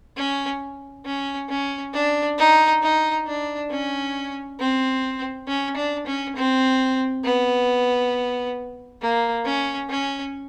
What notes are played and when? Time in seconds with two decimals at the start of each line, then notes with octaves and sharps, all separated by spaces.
0.17 C#4
1.05 C#4
1.49 C#4
1.94 D4
2.38 D#4
2.82 D#4
3.27 D4
3.71 C#4
4.60 C4
5.48 C#4
5.77 D4
6.07 C#4
6.36 C4
7.24 B3
9.02 A#3
9.45 C#4
9.90 C#4